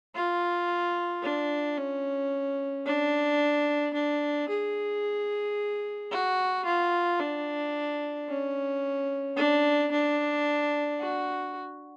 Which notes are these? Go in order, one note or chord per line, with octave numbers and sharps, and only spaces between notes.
F4
D4
C#4
D4
D4
G#4
F#4
F4
D4
C#4
D4
D4
F#4